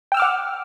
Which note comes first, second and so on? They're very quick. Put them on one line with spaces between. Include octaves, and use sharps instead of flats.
G5 E6 F6 D6 F#5